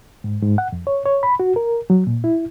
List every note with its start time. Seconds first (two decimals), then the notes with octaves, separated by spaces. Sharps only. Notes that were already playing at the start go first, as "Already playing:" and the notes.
0.24 G#2
0.43 G#2
0.58 F#5
0.72 F2
0.87 C#5
1.06 C#5
1.23 B5
1.40 F#4
1.56 A#4
1.90 F#3
2.07 A#2
2.24 E4